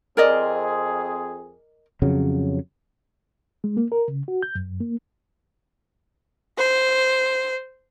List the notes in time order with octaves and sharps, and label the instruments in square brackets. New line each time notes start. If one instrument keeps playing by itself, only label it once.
[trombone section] F2 C4 G#4 [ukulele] A#4 D5 D#5
[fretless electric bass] F2 C#3 F#3
[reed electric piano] G#3
A#3
A#4
C#3
F#4
G6
F#2
A#3
[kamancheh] C5